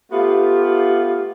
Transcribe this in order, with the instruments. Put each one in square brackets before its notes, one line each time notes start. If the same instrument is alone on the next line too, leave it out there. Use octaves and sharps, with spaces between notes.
[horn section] A3 B3 F4 [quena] G4